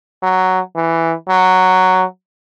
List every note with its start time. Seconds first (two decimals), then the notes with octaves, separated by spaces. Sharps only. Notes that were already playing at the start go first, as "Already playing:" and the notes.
0.23 F#3
0.76 E3
1.29 F#3